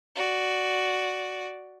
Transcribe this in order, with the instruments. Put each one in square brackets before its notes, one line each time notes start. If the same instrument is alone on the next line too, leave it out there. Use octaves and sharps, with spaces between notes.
[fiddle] F#4 D5